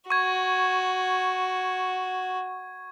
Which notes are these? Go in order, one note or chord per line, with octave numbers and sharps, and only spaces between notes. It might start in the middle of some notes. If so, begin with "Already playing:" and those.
F#4 C#6 G#6